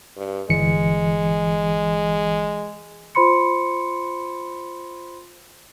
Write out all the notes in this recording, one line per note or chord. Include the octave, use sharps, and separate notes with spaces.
G2
G1 E3 G#3 C#7
F4 C5 B5 C6 C#7